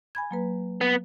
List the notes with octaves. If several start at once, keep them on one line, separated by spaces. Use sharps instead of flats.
G#5 B5 G#6
F#3 A#3 B4
B3